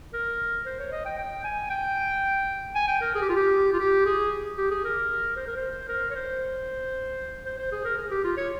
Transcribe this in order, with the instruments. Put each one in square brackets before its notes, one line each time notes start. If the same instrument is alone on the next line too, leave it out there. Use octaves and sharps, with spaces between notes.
[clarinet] A#4
C5
C#5
D#5
G5
G5
G#5
G5
G#5
G5
A#4
G#4
G4
F4
G4
F4
G4
G#4
G4
G#4
A#4
C5
A#4
C5
A#4
C#5
C5
C5
C5
G#4
A#4
G#4
G4
F4
C#5